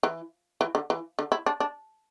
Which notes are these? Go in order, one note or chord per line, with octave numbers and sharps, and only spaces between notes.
E3
E3
D3
E3
D3
E4
D4
D4